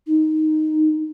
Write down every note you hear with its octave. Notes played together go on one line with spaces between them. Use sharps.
D#4